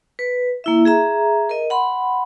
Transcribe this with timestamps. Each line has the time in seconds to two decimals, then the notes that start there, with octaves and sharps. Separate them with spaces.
0.19 B4
0.64 A#3 E4 E5
0.85 G#4 E5 A#5
1.49 A#4 D#5
1.70 F#5 B5 C6